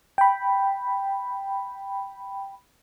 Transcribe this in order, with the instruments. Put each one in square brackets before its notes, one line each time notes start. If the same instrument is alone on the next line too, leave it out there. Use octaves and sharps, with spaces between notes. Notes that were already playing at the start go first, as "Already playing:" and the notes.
[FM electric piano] G5 B5